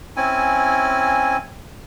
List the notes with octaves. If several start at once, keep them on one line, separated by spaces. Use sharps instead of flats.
C4 C#4 E4 G#5